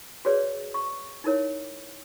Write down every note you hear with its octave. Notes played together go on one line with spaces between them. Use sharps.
F#4 G#4 B4 C#5 D5
C#6
D#4 E4 A#4 C#5